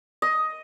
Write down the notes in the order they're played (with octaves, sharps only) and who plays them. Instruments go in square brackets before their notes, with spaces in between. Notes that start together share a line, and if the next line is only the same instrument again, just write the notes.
[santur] D#5